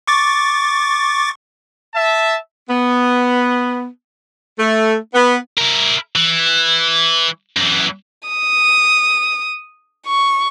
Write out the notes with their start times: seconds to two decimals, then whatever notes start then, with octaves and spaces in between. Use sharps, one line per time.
0.07 C#6 D6 A6
1.94 E5 A5
2.70 B3
4.59 A3
5.14 B3
5.58 E4 A#4
6.16 E3
7.56 F#2 E3
8.29 D#6
10.07 C#6